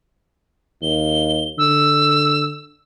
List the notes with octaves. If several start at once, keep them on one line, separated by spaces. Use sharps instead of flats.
D#2 G7
D3 E6